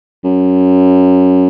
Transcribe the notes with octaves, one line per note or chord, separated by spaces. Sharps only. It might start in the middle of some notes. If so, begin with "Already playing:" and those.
F#2